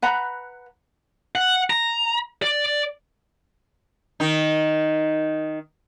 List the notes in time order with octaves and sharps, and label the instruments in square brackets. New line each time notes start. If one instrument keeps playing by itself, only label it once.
[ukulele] B4 F#5 A#5 B5
[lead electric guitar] F#5
A#5
D5
[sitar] D#3 D#4